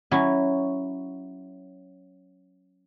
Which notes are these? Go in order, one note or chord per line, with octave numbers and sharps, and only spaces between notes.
F#3 C#4 E4